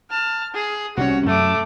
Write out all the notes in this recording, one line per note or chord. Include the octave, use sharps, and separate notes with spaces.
A5 F6
G#4
C2 C3 C#4 F#4 C#5
F#2 A3 D6